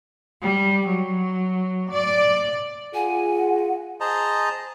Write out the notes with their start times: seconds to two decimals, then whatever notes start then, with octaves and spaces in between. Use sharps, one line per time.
0.42 G3
0.88 F#3
1.90 D5
2.94 F4 G#4 F#5 G#5
4.01 G#4 C5 D#5 A5 A#5